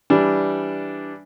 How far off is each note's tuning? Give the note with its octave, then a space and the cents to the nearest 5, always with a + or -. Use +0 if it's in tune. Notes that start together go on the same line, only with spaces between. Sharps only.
E3 +0 G3 +0 D4 -5